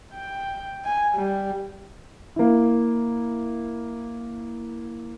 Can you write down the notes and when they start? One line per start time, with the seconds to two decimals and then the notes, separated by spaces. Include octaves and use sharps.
0.14 G5
0.85 G#5
1.15 G3
2.36 A#3 E4